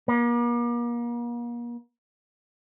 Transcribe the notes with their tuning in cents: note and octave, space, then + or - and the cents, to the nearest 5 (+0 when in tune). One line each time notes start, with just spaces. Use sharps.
A#3 +40